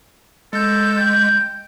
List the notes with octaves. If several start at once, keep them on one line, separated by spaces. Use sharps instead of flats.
G#3 A4 G6
G5